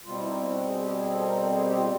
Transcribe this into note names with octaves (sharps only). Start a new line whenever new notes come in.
B2 G3 C4 F4
E4
D#4
E4
F#4
G#4
G4
G#4
A4
A#4
A4
G#4
G4
F4